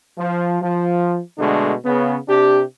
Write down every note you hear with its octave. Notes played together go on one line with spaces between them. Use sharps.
F3
F3
B2 D3 G#3 A3 D4
C#3 B3
C3 D4 G4